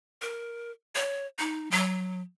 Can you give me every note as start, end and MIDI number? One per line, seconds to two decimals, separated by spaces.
0.22 0.71 70
0.95 1.26 73
1.39 1.70 63
1.71 2.21 54